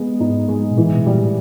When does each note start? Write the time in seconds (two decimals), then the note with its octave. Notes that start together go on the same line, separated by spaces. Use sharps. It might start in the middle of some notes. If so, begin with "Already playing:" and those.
Already playing: G#3 B3
0.20 G#2 D#4
0.49 G#3
0.71 A#2
0.77 A2 E3
0.92 B2
1.06 A#2 G3
1.20 A2